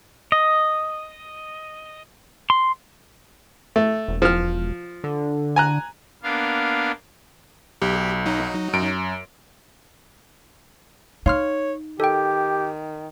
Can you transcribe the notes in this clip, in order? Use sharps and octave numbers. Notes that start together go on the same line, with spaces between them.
D#5
C6
A3
E1
F3 F6
D3
G#5 A#5 F#6
A#3 B3 D4 F5
B1 G4
F#3 D#4
F#2 D7
D#4 C#5 F5 C6 F6
D#3 G4 A4 G5